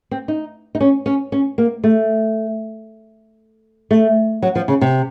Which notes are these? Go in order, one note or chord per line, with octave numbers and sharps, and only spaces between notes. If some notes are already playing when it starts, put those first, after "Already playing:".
C4
D#4
D#4
C#4
C#4
C#4
A#3
A3
A3
F#3
F3
C#3
C3